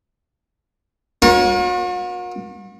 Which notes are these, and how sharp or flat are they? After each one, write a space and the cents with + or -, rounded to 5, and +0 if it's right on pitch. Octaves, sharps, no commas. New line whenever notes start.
F#4 -45 A#4 +35 C#5 +0